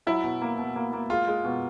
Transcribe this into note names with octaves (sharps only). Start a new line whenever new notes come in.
F#3 E4
B2
A#3
B2
A#3
A#3
G#3 F4
G#3
B2